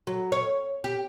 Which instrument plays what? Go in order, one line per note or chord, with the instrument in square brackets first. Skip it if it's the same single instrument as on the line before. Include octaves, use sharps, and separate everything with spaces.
[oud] F#3
C#5
G4